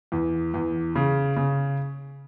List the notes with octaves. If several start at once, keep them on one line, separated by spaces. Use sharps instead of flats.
E2
E2
C#3
C#3